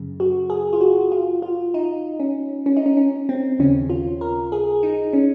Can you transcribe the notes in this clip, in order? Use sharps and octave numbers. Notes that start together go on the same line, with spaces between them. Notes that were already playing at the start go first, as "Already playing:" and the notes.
Already playing: F#2 C#3
F#4
G#4
F4
F#4
F4
F4
D#4
C#4
C#4
D#4
C#4
C#4
C4
D#2 C#3 C#4
F4
A#4
G#4
D#4
C#4